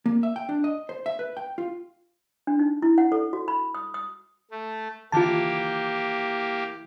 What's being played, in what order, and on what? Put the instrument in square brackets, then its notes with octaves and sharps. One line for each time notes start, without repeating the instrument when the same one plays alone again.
[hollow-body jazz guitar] A#3
E5
G5
D4
D#5
C5
E5
B4
G5
F4
[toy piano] D4
D#4
E4
F#5
A4
F#4
B5
D#6
D#6
[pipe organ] A3
[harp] E3 [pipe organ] A#3 G4 [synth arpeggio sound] F4 A5